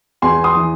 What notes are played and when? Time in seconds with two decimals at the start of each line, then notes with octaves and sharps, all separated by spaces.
0.22 E2 G#5 C6
0.44 C6 D#6
0.55 E3